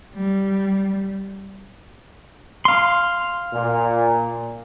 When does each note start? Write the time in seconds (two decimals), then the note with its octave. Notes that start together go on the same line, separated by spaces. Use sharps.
0.14 G3
2.65 F5 C6
3.54 A#2